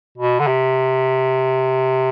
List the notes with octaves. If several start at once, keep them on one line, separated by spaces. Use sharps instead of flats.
B2
D3
C3